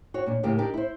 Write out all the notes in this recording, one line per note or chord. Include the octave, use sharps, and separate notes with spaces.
F#4 C#5
A#2 D4
D#2 A2 C#3 G4 A#4 F5
D4 D#4 G4 A#4
E4 C5